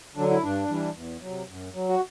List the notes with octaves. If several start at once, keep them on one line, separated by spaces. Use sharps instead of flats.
D3 F#3 D4
E4
G2 D4
E3 G3
E2
C3 F#3
F#2
F#3
F#4